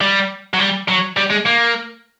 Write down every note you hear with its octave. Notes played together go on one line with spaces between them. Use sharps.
G3
F#3
G3
F#3
G3
G#3
A#3